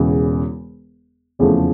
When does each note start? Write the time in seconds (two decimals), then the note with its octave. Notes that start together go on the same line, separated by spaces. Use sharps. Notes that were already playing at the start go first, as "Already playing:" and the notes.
Already playing: E1 E2 C#3 E3
1.39 F1 E2 C#3 F3 A3